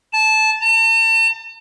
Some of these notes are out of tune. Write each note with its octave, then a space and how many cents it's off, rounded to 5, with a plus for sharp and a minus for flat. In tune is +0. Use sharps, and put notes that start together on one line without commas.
A5 -15
A5 +40